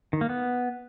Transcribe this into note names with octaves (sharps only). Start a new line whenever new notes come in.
D#3
A#3
B3